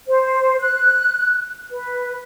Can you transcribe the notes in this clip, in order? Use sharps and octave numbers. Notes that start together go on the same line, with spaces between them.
C5
F#6
B4